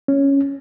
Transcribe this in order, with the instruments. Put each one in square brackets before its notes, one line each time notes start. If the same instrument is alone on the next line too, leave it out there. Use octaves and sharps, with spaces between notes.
[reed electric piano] C#4